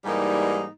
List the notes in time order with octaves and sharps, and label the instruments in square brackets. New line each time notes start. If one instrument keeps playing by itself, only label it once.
[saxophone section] G#2 E3 G3 A#3 D#4